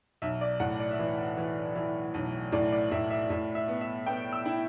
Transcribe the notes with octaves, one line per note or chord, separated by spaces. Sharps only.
B1 E5
D5
A2 F#5
D5
E5
E3 D5
E3
E3
B1
A2 D5
D5
A2 E5
E5
A2 E5
E5
B3
E5
B3 G5
E6
E4